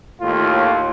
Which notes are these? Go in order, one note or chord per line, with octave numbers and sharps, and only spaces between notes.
D#2 A2 F4